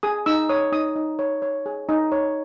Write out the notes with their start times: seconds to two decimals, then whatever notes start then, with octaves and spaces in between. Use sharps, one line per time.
0.03 G#4 D#6
0.26 D#4 E6
0.49 C#5 D#6
0.72 D#4 D#6
0.96 D#4
1.19 C#5
1.42 C#5
1.66 G#4
1.89 D#4
2.12 C#5